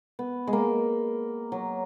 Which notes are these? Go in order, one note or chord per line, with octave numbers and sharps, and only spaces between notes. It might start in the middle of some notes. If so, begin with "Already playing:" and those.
B3
G#3
A#3
F#3